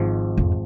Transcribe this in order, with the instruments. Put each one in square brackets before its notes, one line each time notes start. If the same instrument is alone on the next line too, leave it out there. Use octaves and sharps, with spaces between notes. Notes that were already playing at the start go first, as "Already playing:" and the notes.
Already playing: [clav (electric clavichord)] G#1 G#2 F3
[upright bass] F2